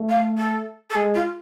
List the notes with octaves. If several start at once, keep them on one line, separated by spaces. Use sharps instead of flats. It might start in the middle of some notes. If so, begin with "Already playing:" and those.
Already playing: A3
F5
A4
A4
G#3 G#4
F4